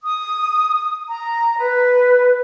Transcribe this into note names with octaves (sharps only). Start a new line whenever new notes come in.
D#6
A#5
B4